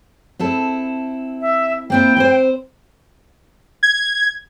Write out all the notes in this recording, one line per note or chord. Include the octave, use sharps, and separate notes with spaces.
C4 E4 A4
E5
A#3 C4 E4 G5
C4 B4 C5
G#6